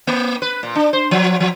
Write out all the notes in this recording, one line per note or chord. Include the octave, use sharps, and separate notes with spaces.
A#3
B4
A#2
D4
C5
F3
F3